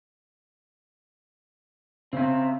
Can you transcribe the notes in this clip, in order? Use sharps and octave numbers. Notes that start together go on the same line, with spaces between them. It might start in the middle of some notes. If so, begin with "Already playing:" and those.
C#3 C4 E5